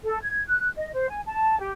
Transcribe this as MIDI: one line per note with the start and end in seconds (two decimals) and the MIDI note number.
0.03 0.19 69
0.23 0.42 92
0.47 0.69 90
0.77 0.91 75
0.93 1.06 72
1.09 1.20 80
1.25 1.57 81
1.60 1.71 67